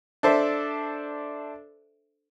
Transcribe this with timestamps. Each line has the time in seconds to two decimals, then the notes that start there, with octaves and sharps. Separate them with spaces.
0.23 D4 A4 C5 E5